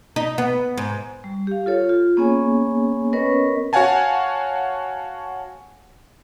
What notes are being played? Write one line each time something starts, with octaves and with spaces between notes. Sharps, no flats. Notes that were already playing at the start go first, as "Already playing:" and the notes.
D#4
B3
G#2
G3
G4 F5
F4 A4 C#5
F4
A#3 B3 C#4 G#4 C#5 G#5
B3 C#4 A#4 B4 C#5 D#5
F#4 C#5 F5 F#5 G#5 A5